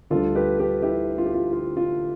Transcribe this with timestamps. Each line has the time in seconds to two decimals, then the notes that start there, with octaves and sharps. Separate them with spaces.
0.10 D2 D3 G3 D4 F4 A4
0.35 G4 B4
0.59 G4 B4
0.82 E4 G4
1.18 F4
1.25 G4
1.34 F4
1.53 F4
1.77 F4